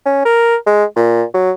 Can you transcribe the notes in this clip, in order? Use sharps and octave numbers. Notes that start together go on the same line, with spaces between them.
C#4
A#4
G#3
A#2
F#3